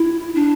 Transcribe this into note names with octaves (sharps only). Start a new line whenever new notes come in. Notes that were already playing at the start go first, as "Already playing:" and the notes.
Already playing: E4
D4